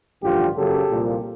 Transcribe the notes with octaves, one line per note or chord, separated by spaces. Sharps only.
A1 G2 D3 F3 F4 G4
F#2 C#3 F#3 A#3 G4 A4
C2 A#2 F3 A#3